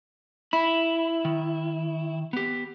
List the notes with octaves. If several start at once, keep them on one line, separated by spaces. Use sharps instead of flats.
E4 B5
D#3
B3 G4